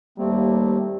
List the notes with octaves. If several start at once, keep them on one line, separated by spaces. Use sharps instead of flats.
D#2 G3 A3 A#3 C4